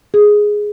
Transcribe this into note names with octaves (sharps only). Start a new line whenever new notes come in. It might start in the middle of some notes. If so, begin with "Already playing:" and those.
G#4